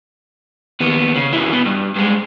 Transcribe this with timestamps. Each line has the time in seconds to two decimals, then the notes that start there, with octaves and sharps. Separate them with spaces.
0.80 D#2 B3
1.16 C#3
1.33 F#2 E3
1.53 B2
1.66 G2
1.96 G2 G#3